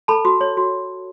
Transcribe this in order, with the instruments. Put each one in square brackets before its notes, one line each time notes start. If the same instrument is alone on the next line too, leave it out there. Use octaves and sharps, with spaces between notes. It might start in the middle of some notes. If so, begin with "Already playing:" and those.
[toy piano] A4 A5 B5
F#4
C#5
F#4